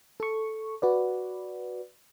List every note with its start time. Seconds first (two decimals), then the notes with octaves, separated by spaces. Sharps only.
0.20 A4 C#6
0.82 F#4 B4 D5